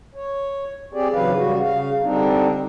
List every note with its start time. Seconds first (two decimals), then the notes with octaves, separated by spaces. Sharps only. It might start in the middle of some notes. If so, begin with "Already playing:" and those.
0.15 C#5
0.93 C4 G4 G#4 D5
1.13 G#2 C#3 E3 F#3 B4 F5
1.36 C#3 G3 F#4
1.62 C#3 F5
2.02 D3 G3 C4 D4 D#4